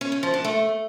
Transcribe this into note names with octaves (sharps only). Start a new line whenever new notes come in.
C#4
C#4
F3
D4
A3